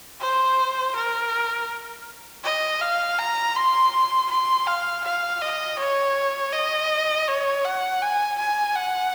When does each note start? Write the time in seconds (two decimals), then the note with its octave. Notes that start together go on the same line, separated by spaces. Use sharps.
0.21 C5
0.96 A#4
2.44 D#5
2.81 F5
3.19 A#5
3.56 C6
4.30 C6
4.67 F5
5.05 F5
5.42 D#5
5.79 C#5
6.53 D#5
7.27 C#5
7.65 F#5
8.02 G#5
8.39 G#5
8.76 F#5